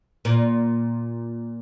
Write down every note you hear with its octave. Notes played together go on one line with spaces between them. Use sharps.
A#2